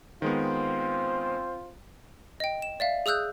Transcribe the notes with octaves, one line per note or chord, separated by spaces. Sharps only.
D#3 G#3 B3 C4 F4 C5
D#5 G5
E7
D5 E5 F5
G#4 D#6 E6 F#6 G6